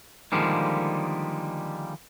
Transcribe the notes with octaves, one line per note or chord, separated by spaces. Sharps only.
D3 D#3 F3 G3 G#3 A#3